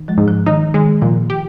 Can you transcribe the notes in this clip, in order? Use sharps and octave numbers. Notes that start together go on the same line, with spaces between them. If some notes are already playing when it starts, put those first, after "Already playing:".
Already playing: D#3
F3 G#3
G#2
F3
D#3 D#4
D#3 G#3
A#2 F3
G4